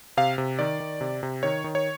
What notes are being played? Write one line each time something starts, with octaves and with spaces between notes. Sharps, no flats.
C3 F5
C3
D#3 D5
D#3
C3
C3
D#3 C#5
D#3
C#5